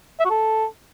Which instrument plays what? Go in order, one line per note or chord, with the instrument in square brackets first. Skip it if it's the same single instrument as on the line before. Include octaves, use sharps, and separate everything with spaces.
[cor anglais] E5
F#4
A4